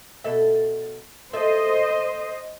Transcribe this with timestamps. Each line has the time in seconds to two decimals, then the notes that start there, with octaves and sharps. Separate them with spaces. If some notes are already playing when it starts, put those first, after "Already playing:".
0.24 B2 A4 E5
1.33 A4 C5 D#5 E5